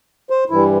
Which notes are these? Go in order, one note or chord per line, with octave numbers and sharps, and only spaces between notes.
C5
G2 E3 G3 E4